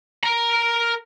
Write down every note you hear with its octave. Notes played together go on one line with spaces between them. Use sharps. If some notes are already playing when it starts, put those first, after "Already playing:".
A#4 A#5